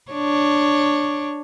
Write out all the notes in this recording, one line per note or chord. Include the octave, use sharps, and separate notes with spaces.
D4 C#5